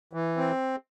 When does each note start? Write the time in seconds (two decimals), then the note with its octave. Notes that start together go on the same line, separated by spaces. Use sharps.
0.13 E3
0.37 C4